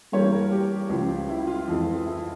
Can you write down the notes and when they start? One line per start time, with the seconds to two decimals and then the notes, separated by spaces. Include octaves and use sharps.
0.12 G2 E3 G3 A#3 C#5
0.32 A#4
0.51 G4
0.89 C#2 C#3 F3
1.29 E4
1.47 F4
1.68 F2 E3 G#3
2.06 E4